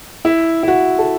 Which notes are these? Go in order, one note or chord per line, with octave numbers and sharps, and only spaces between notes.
E4
E4
F#4
A4